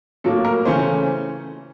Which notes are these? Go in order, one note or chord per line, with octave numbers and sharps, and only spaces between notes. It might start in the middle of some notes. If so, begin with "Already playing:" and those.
A2 F#3 A#3 A4
A#4
C#3 E3 A3 C#4 C5